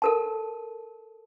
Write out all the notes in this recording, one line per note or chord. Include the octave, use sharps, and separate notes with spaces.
A4 A#4 A5